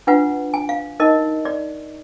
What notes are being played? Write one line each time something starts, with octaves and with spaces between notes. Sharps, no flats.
D4 F4 B4 F#5
G#5
F5
D#4 A#4 D#5
D5